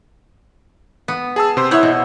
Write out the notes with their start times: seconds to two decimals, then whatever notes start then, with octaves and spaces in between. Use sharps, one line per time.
1.08 B3
1.36 G#4 A5 E6
1.57 C3 C5 C6
1.71 B3 E4 C#5 F#5 E6 G6
1.83 B2